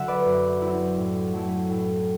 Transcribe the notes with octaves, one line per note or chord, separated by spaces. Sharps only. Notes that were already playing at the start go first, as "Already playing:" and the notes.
Already playing: D3 F#3 E5 F#5
B4 D5
F#2
F#3 C4 E4
A2
F#3 A3 E4
A2